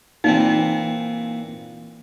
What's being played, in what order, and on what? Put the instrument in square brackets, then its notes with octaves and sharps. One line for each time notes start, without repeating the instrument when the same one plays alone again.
[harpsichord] A#2 E3 C4 [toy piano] D#4